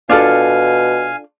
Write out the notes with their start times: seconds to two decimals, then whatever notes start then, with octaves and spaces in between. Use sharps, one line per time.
0.09 B2 D4 F4 A4 F5 G#5